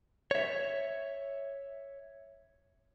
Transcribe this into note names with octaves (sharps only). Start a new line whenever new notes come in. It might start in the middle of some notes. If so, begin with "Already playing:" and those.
C#5 E5